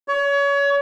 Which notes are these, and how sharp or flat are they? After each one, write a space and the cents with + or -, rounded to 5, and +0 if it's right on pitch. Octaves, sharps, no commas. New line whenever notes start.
C#5 +30